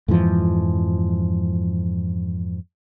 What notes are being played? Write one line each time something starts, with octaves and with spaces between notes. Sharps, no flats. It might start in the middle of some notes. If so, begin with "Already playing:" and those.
F2 G#2 E3 F3